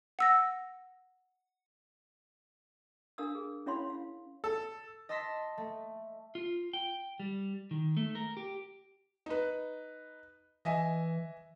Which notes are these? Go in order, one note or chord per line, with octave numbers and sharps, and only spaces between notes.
F#5 E6 A#6
D4 A#4 F5 D#6 E6
G#4
C#4 E4 C#5 F5 B5 C6
F5
A4
D#5 A5 C6 E6 A#6 B6
A3
F4
G5
G3
D#3
A3
A#4
G4
D#4 B4
E3 D#5 E5 G#5